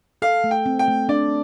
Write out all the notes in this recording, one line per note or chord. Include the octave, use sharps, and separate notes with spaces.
A4 F5
A3
G5
C4
G5
A3
D4 D5